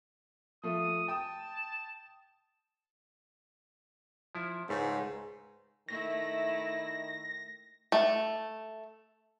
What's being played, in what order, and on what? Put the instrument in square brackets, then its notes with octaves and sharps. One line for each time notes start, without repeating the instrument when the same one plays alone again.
[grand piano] F3 A3 [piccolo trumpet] D#6
[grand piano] G5 D#6 [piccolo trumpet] A5
[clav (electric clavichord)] F3 E4
[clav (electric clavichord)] C#2 A3 [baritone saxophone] G#2
[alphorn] D#3 [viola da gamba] A3 E4 [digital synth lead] A#6
[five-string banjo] A3